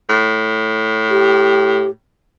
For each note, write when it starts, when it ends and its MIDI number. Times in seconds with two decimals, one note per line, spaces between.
0.09 1.88 45
1.10 1.89 67